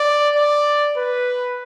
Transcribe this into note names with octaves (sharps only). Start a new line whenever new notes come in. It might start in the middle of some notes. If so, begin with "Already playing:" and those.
Already playing: D5
D5
B4